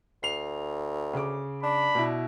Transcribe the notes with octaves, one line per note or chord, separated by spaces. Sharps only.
D2 C7 F7
C#3 D6
D4 B5
B2 E4